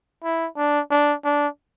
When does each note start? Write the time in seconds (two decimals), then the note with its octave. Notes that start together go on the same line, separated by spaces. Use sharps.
0.24 E4
0.57 D4
0.91 D4
1.24 D4